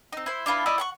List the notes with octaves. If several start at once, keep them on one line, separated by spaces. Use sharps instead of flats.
C4 D#4
E4 C5
D4 E4 F4 B4
E4 D5 D#5 B5
F#5 A5 C#6